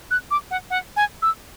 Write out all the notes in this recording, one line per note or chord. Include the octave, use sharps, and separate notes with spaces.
F#6
D6
F#5
F#5
G#5
E6